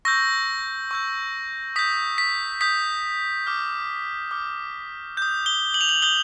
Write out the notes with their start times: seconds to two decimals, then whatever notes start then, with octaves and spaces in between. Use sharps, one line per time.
0.05 C#6 E6 G6 A#6
0.91 C#6 E6 G6
1.76 D#6 G6 B6
2.18 B6
2.61 D#6 G6 B6
3.47 D6 F6
4.31 D6 F6
5.17 D#6 G6
5.46 G7
5.74 F#7
5.81 F7
5.89 F#7
6.02 D#6 G6 G7